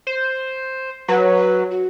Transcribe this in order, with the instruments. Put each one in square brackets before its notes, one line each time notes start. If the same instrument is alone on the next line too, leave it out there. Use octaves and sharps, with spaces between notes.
[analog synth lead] C5
[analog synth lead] F#3 [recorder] B4
[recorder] F#4